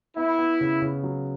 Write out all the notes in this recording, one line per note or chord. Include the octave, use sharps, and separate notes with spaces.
B3 E4
B3
C#3
C#3
F#3